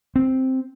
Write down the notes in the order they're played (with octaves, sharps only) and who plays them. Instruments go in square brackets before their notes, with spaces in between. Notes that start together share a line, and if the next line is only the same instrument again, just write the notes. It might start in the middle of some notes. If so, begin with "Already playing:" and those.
[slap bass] C4